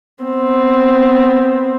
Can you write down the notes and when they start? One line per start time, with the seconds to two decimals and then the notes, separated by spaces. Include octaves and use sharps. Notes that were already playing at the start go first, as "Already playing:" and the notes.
0.24 B3 C4